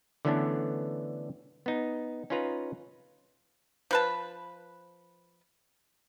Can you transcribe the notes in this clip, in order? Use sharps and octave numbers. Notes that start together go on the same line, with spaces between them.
D3 E3 A3 B3 C#4 D4
B3 D#4
C#4 D#4 F4 B4 A#5
F3 B4 A5